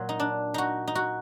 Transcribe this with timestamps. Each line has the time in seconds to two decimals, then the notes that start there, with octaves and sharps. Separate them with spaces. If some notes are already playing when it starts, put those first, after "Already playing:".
Already playing: A#2 F#3
0.09 D#4
0.20 D4
0.54 D#4 F#4
0.87 D#4
0.95 F#4